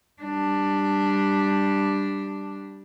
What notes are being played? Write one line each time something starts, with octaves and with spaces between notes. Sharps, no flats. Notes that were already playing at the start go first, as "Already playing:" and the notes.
G3 D4